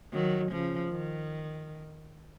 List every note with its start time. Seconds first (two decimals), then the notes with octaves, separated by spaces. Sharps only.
0.13 D#3 F#3
0.52 C#3 F3
0.91 D#3